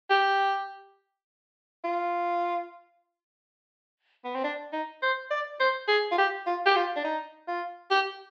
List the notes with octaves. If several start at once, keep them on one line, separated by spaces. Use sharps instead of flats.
G4
F4
B3
C4
D4
D#4
C5
D5
C5
G#4
F4
G4
F4
G4
F4
D4
D#4
F4
G4